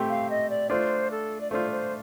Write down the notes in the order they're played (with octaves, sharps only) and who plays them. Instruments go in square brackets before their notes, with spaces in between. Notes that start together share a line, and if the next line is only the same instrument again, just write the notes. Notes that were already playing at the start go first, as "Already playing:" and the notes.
Already playing: [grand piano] A3 C4 G4
[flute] F5
D#5
D5
[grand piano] A3 D4 F4 [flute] C5
[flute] A4
D5
[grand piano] A3 D4 F4 [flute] C5
[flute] C5